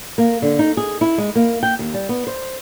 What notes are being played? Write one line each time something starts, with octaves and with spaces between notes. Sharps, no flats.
A#3
D3
D#4
G#4
E4
G#3
A#3
G5
D#2
G3
B3
C5